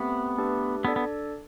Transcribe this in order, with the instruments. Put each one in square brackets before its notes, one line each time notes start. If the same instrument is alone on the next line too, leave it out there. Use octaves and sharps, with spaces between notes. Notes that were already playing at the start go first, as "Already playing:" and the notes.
Already playing: [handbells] A3 C4 G4 [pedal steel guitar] B3
[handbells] A3 D4 G4 B4
[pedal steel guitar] B3 [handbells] D4 A4 D5
[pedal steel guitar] B3